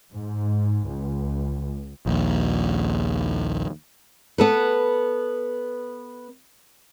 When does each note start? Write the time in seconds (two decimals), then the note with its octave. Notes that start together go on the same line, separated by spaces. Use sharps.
0.12 G#2
0.86 C#2
2.06 A#1 D#2
4.38 B3 A4 B4